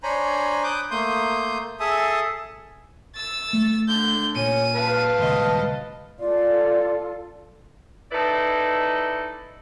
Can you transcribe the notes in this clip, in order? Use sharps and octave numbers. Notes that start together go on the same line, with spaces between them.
D4 C5 C#5 G#5 A#5 B5
D6 D#6 F#6 G6
A3 A#3 C6 D#6 G6
G#4 A4 E5 A5 D#6
E6 A6
A3
D3 G6
A#2 C#4 D#7
B4 F5 A5
D#1 C#2 D#5
F4 A4 D5
D#4 E4 A4 B4 D5